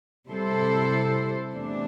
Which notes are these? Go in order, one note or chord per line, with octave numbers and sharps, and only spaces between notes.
C3 G3 E4 A4 C5
E2 C3 E3 A3 D4